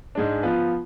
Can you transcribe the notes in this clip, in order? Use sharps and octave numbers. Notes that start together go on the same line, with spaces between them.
G#2 G#3 D4
F3 B3 F4 B4